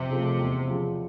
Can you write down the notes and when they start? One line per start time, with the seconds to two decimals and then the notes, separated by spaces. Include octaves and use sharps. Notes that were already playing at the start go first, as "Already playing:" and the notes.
Already playing: F2 C3
0.10 C#3 F3 A3
0.39 E2
0.67 C#3 F3